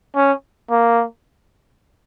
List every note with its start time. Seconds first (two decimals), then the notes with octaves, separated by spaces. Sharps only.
0.16 C#4
0.70 A#3